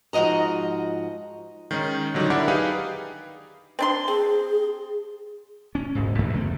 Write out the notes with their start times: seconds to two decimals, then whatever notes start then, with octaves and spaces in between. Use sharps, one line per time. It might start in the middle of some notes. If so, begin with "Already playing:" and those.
0.13 G#2 F3 F#4 D#5 A#5
1.71 D#3 G#3 C#4 D#4
2.14 D3 D#3 F#3 G3 D4 D#4
2.30 D4 E4 G4 A#4 D5 F#5
2.48 D#4 G4 G#4 B4 F5
3.79 C4 D4 C6
4.08 C4 G#4
5.75 C#4
5.95 D#1 G#1 D#2 G#2
6.18 A1 G2 D3 F#3
6.33 F#1 E2 A3 C4